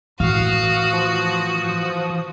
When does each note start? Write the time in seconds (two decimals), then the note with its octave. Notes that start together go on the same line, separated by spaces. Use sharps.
0.20 A2 E3 F#4 F5 D#6
0.93 F3